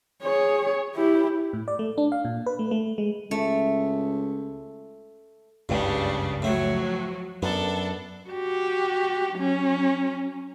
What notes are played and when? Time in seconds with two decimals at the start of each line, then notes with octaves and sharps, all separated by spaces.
0.22 G#4 C#5
0.95 E4 G4
1.53 A2
1.68 D5
1.79 A3
1.98 D4
2.12 F5
2.25 A#2
2.46 B4
2.59 A3
2.71 A3
2.98 G#3
3.31 C#2 A3
5.69 F#1 C#2 G2 C#3 G3 D4
6.42 A2 F3 F#3 A3
7.42 F#2 B3 D4 A4
8.29 F#4 G4
9.34 F#3 C#4